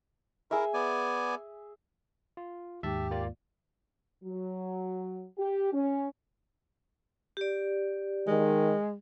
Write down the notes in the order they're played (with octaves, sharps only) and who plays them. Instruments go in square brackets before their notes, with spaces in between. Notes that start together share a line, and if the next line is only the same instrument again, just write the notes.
[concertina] E4 A#4 [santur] G#4 E5
[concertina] B3 D5 G#5
[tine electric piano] F4
[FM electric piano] D#2 G#2 [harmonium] G4 [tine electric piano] E5 A5
[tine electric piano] A#3 F4 D5
[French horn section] F#3
G4
C#4
[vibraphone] G4 D5
[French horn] D#3 [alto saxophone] G#3